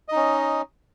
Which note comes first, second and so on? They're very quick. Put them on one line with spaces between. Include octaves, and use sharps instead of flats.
D#5 D#4 C#4